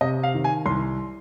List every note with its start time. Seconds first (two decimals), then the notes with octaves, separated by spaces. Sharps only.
0.01 C3 D#5
0.23 F5
0.34 D#3
0.44 G#5
0.66 C2 C6